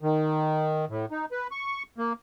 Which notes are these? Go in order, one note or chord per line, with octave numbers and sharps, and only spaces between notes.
D#3
A2
D#4
B4
C#6
A#3